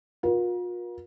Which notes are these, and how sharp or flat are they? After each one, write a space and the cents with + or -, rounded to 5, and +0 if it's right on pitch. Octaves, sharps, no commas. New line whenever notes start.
F4 +40 A#4 +40